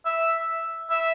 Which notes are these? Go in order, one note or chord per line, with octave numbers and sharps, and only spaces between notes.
E5
E5